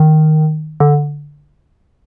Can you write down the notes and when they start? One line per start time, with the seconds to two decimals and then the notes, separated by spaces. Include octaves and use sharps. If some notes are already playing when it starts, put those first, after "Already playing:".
Already playing: D#3
0.80 D3